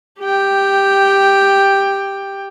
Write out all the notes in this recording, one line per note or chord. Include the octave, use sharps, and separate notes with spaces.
G4 G5